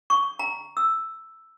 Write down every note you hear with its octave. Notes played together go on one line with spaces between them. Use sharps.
C#6
A#5
E6